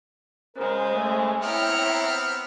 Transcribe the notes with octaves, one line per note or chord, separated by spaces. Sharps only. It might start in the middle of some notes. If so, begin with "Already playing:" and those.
C#3 G#3 A#4 C5
A3
B3 C4 E4 C#5 E5 G5 A#5 F6